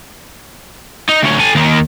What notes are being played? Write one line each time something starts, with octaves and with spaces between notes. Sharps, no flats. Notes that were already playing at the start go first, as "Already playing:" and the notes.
D#4
D2 C#4
A4 G#5
D#2 D#3